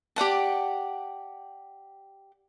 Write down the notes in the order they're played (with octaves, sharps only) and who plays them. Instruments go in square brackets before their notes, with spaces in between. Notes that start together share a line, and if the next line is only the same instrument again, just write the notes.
[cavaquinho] G4 D5 F#5 A5